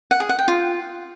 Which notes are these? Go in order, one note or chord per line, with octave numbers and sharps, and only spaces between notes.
F#5
G#4
F#5
G5
F4